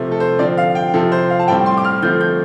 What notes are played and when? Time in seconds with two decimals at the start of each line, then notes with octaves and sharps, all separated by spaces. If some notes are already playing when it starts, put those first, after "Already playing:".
Already playing: C3 F3 A3 C4
0.11 A4
0.20 C5
0.39 D3 F3 C4 D5
0.57 F5
0.75 G5
0.94 C3 F3 C4 A4
1.12 C5
1.30 F5
1.39 A5
1.48 A2 G3 C4 G5
1.66 C6
1.77 D6
1.85 F6
2.02 D3 F3 A3 C4 G6
2.21 G6